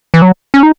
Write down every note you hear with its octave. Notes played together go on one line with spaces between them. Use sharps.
E3
F#3
C#4
D#4